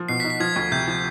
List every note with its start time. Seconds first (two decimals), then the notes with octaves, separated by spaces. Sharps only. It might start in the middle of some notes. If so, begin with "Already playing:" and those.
Already playing: F3
0.08 B2 C7
0.20 B6
0.24 D#4
0.30 B6
0.40 F3 G#6
0.56 D2
0.72 C3 G6
0.88 F3